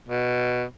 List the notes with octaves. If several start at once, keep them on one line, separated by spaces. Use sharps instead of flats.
B2